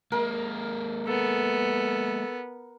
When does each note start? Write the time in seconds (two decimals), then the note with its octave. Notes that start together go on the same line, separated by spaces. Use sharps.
0.12 G#3 A#3 A#4
1.07 B3 A4